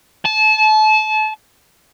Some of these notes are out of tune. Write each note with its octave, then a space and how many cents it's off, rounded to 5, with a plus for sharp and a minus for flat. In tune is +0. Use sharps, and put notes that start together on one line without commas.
A5 -30